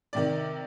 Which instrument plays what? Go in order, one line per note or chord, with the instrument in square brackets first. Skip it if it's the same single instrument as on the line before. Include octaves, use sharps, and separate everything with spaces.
[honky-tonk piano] C3 D#3 D5